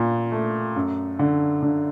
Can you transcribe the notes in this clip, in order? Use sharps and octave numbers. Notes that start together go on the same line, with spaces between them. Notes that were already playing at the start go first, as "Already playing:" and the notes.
Already playing: A#2
A3
F#2
D3
D3